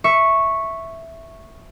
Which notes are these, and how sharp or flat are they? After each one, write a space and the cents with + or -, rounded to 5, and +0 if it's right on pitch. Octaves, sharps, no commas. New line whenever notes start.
E5 +0 C#6 -5